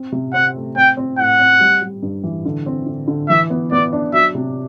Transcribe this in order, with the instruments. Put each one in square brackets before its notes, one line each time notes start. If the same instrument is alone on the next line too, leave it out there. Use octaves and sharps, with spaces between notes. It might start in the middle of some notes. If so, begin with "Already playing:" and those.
Already playing: [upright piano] C4
C3
[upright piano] C4 [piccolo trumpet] F#5
[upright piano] A3
[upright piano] C4 [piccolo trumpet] G5
[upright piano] C4
[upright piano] A2 [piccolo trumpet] F#5
[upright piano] C4
G3
G3
G2
E3
D3
C4
D3
D3
[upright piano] E3 [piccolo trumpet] E5
[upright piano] B3
[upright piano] B3 [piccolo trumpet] D5
[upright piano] D4
[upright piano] F#3 [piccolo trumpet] E5
[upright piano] C3